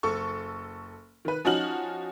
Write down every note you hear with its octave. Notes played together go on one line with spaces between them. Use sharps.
F#1 A4 C#6
D#3 B4
F3 C#4 D#4 F#4 F6 F#7